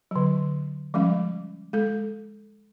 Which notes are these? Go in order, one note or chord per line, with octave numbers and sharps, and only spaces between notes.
D3 F#3
F3 G3 G#3 C#4
G#3 A4